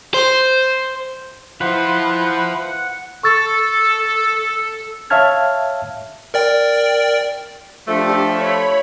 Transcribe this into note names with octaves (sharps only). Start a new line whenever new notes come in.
C5
E4 F4 B4 C5 F#5
A4 C#6 E6 A6
C#5 E5 F5 A5 F6 G#6
A#4 D5 G5
F3 A3 D4 G4
C#5 B5